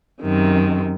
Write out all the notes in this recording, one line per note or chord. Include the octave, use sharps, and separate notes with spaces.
F#2 C3 D#3